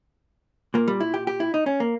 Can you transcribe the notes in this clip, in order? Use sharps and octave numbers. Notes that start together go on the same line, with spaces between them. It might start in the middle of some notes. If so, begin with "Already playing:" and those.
A#2 A#3
G3
E4
G4
G4
E4
D#4
C#4
A#3